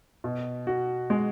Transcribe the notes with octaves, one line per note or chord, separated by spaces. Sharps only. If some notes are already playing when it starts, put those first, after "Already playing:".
B2
F#4
G#3